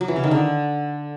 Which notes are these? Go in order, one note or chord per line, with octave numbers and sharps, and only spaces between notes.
F#3
E3
C#3
D#3
D3